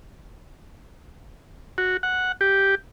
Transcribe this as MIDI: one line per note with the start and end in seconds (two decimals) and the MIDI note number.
1.78 1.97 66
2.03 2.32 78
2.41 2.75 67